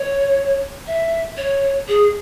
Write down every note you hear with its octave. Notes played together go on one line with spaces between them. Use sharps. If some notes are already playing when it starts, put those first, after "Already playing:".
Already playing: C#5
E5
C#5
G#4